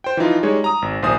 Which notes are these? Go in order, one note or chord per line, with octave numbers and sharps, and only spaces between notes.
C5 G5
E3 F3 D#4 F4
G3 G#3 D#4 C#5
A#5 D#6
G#1
A#1 D#2 C5 G#5 D#6